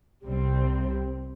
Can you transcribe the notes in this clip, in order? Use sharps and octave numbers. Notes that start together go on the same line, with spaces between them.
C2 C3 G3 C4